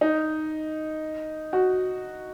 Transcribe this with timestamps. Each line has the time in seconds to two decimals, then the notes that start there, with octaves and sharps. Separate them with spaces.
0.01 D#4
1.53 F#4